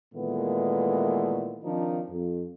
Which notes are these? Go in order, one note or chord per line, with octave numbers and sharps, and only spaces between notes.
A#2 D#3 E3 G#3 A3 B3
D#3 F3 C4 D4 D#4
F2